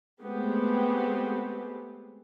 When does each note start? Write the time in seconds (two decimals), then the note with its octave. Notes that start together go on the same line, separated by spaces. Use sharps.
0.21 G#3 A3 B3 C4 G4